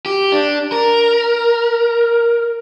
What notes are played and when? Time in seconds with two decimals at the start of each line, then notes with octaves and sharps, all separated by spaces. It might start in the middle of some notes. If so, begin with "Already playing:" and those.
0.06 G4
0.32 D4
0.72 A#4